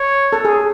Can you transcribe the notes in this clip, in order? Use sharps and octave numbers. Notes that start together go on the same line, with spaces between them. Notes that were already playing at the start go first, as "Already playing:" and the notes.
Already playing: C#5
A4
G#4